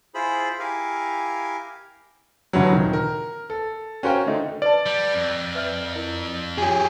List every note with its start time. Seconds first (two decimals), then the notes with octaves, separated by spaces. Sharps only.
0.15 E4 F4 G#4 C5 B5
0.59 E4 G4 A#4 F5 G#5
2.53 D2 G2 E3 F#3
2.72 D#1 D#3
2.93 A#4
3.50 A4
4.03 C#4 F#4 A#4 C5 F5 G5
4.27 D3 A3 D#4
4.62 B4 D5 A5
4.86 G3
5.14 F2
5.55 B4 E5 F6
5.95 E4 A#4
6.58 F4 G4 G#4 C#5